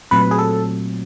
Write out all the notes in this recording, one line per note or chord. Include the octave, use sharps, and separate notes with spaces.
A#2 F#3 A3 C4 F4 B4
G#4
A4